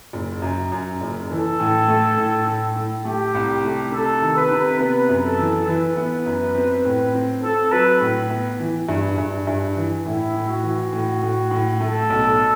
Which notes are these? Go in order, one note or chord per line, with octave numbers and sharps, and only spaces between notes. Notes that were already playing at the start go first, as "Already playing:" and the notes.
F#1
F#2
F#2
F#1
E3 A4
A2
A3
A2
A2
A2
A3 G4
C2
A3
C3 A4
D#3
B4
C3
B3 B4
F#2
A4
E3
E3 B4
B3
F#2
C4
A2
C4
C4 A4
F#3 B4
A2
B3
E3
G2
G2
G2
E3
A2 E4
A2
F#4
E3
A2
A2
A2
A3 A4
B1